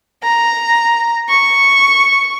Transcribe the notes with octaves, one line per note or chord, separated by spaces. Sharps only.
A#5
C#6